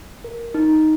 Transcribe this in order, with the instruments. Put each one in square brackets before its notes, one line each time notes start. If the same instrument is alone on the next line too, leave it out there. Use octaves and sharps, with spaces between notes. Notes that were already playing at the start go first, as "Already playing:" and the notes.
[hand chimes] A#4
D#4